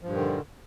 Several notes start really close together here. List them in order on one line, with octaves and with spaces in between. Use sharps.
F3 G2 A#2 D#3 D3